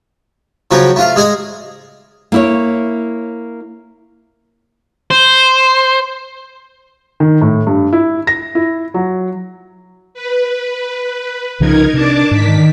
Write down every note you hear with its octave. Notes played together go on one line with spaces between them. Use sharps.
C#3 F3 F#3 C4 C#4
A3 F4 F5
G#3 G#4 D#5 G#5
A#3 E4 C#5
C5
D#3
A2
G2
E4
A#6
E4
F#3
B4
C2 C#3 F3 D#4 A#4 G#6
C3 D4 A5 D6
G#2 D#3 B6